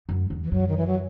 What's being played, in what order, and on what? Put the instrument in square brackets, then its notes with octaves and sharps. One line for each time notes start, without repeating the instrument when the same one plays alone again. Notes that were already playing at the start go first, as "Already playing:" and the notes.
[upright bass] F#2
E2
[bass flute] E3
[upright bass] F#2 [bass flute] F#3
[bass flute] D#3
E3
F#3